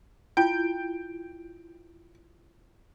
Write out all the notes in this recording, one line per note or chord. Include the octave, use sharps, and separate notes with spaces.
E4 F4 G5